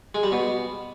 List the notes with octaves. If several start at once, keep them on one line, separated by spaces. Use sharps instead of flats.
G#3
G3
B2